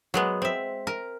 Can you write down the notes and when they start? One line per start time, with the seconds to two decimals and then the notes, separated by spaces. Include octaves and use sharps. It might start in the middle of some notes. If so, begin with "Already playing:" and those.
0.14 F#3 G#3 B3
0.42 C4 E5
0.87 A#4